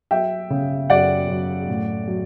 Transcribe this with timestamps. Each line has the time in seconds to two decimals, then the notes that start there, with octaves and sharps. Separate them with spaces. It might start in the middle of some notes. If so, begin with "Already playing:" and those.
0.11 F#3 E5 G5
0.50 C#3
0.90 F#2 D5 F#5
1.28 F#2
1.68 A2
2.08 F#3